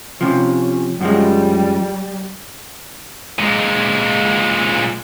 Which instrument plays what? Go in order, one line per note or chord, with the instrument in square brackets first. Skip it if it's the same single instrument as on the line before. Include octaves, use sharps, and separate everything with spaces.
[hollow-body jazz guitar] C3 F3 [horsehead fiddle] C#4
[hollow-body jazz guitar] F#2 F3 G#3 [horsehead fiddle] G3
[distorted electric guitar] A#2 G#3